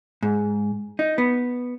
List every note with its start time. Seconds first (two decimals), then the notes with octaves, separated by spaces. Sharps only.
0.22 G#2
0.99 D#4
1.18 B3